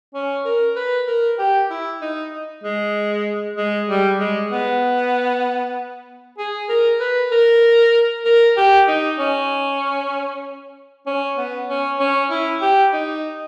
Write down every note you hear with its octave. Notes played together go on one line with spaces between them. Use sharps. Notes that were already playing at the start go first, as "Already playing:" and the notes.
C#4
A#4
B4
A#4
G4
E4
D#4
G#3
G#3
G3
G#3
B3
G#4
A#4
B4
A#4
A#4
G4
D#4
C#4
C#4
B3
C#4
C#4
E4
G4
D#4